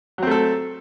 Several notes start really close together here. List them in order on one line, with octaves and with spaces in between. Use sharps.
F#3 C4 A3 A4